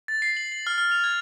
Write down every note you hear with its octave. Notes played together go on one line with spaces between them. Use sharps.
A6
C7
F#7
F#7
F6
F6
F7
G#6